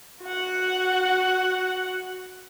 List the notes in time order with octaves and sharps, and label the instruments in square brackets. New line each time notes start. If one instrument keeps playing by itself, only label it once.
[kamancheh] F#4 F#5